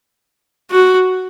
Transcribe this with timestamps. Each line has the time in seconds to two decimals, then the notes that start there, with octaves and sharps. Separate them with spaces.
0.71 F#4